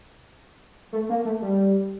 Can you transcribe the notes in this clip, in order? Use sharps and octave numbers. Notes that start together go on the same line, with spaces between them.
A3
A#3
A3
G3